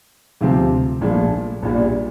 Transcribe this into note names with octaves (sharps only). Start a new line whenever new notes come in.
D2 C3 F3 C4 G4
A#1 A#2 F3 A3
A#1 A#2 G3